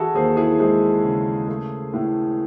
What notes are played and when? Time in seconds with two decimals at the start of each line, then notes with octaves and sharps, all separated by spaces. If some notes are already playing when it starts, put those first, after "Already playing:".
Already playing: E3 E4 F#4 G#4 A4
0.14 D#2 G#4 C5
0.37 E4 G#4
0.59 G#3 G#4 C5
1.04 C#3
1.48 A3
1.94 A2